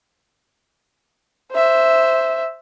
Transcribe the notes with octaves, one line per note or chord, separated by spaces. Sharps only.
C5 E5